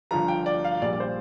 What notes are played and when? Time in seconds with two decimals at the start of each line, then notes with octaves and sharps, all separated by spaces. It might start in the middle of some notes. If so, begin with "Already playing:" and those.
0.11 G1 G2 F3 A#5
0.28 G5
0.46 D5
0.64 F5
0.81 A#1 A#2 G3 D5
0.93 D5
1.00 C5